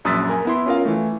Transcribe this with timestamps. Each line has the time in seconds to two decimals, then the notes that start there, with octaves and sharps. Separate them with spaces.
0.05 A#1 F#2 D#6 E6 A6 B6
0.29 A#4 G#5
0.45 B3 E4 C6
0.66 C#4 F4 A#4 F5
0.85 E3 A3